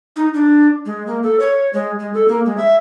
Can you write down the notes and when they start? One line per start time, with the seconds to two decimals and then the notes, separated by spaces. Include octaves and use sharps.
0.16 D#4
0.34 D4
0.86 G#3
1.07 A#3
1.23 A4
1.40 C#5
1.73 G#3
1.99 G#3
2.14 A4
2.28 A#3
2.46 G#3
2.58 E5